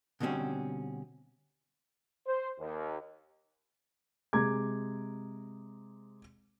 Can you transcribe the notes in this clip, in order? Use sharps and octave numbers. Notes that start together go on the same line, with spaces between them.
B2 D3 G3 C4 C#4
C5
D#2
C3 G#3 G#4 A#5 D6 G#6